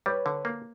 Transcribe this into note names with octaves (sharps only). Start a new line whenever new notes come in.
G3 B4 C#5
D3
A#3